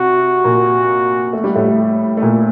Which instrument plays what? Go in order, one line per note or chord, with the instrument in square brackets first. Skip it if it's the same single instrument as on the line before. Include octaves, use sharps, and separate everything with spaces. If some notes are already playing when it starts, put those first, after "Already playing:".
Already playing: [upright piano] C3 C4 [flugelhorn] F#4
[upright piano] A#2 A#3
A3
G3
A2 A3
A3
A#2 A#3